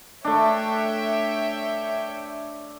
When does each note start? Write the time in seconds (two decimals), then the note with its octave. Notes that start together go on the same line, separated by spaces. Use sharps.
0.25 A3 D4 C#5 E5 G5